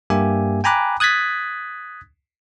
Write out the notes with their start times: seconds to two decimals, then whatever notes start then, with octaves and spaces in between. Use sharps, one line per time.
0.10 G2 G3 A#3 G4 E5 G#5
0.64 G5 G#5 A#5 B5 D6 F#6
1.00 D#6 F#6 G#6 A6 B6